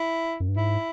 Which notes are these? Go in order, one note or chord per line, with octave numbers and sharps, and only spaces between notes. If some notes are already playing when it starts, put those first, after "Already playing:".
Already playing: E4
F#2
G2
G#2 E4